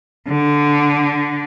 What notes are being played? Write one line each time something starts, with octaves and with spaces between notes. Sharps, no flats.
D3